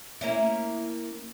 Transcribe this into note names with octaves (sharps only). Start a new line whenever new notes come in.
A#3 C#4 E4